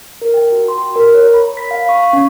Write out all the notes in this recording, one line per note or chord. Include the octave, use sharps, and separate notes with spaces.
A#4
G5
F#4
C6
A#4
C#5
B5
B6
F5
C#6
C#4